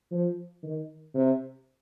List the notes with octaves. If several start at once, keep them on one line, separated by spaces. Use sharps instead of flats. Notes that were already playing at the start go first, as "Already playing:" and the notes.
F3
D#3
C3